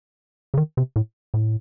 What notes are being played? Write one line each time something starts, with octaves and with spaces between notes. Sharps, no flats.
C#3
D#3
C3
A2
A2